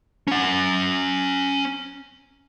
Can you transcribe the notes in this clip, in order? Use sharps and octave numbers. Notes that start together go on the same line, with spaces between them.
C#4 F#5